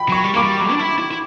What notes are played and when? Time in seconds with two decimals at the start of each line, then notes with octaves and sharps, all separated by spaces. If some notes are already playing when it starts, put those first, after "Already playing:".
Already playing: G5 B5
0.09 F#3 C#6
0.24 G3
0.34 A#3 D6
0.43 G3
0.60 F#3
0.71 D4
0.79 E4
0.98 E4
1.11 E4